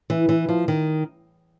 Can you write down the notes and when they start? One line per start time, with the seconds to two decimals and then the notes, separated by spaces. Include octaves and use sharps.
0.10 E3
0.29 E3
0.49 F3
0.68 D#3